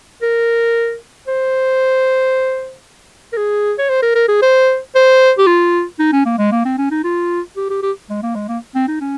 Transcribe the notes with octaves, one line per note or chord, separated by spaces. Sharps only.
A#4
C5
A#4
G#4
C#5
C5
A#4
A#4
G#4
C5
C5
G4
F4
D#4
C#4
A#3
G#3
A#3
C4
C#4
D#4
F4
G4
G4
G4
G#3
A#3
G#3
A#3
C4
D#4
C#4